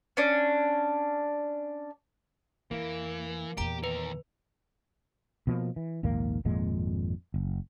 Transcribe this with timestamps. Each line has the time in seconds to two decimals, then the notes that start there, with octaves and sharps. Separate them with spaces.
0.17 C#4 D4
2.71 F2 E3 A#3
3.57 E2 A#2 G4 A#5 D7
3.84 D#2 A#4 B4
5.47 B2 F3 A#3
5.76 E3
6.03 A#1 D#2 G#2 A#3
6.45 G#1 F2 A#2 G#3
7.34 F#1